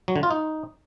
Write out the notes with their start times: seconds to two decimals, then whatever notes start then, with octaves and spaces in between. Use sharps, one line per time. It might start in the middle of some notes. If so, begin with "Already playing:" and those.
0.08 F#3
0.16 D3
0.23 F4
0.31 D#4